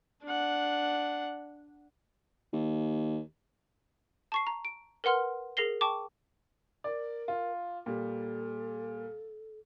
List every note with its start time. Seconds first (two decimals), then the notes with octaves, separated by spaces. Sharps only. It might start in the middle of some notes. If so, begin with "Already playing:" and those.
0.24 D4 F#5
2.53 D#2
4.32 A5 C#6 C7
4.47 A#5
4.65 D7
5.04 A#4 B4 F#5 C6 F6
5.57 G#4 A#4 A#6 C7 G7
5.81 G5 A5 C#6 D6
6.84 A#4 D5
7.28 F4
7.86 A#2 G3 A4